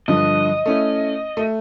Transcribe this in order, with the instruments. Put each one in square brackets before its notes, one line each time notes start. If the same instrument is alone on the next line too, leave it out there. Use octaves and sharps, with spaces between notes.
[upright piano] G2 D3 F3 [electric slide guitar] D#5
[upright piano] A3 C#4 E4
A3